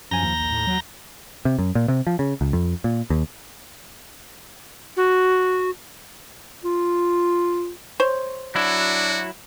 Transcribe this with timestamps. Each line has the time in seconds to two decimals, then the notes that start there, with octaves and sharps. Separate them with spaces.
0.11 F#2 F3 G#5 A#5 G6 A#6
0.23 D#2
0.39 A#1
0.52 A2
0.67 F#3
1.45 C3
1.59 F#2
1.75 A#2
1.88 C3
2.07 F3
2.19 C#3
2.41 C#2
2.53 F2
2.84 A#2
3.10 D#2
4.97 F#4
6.64 F4
8.00 C5 C#5
8.55 F#3 D4 E4 F#4